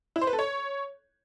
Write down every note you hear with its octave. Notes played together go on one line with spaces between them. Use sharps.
E4
C5
B4
A4
C#5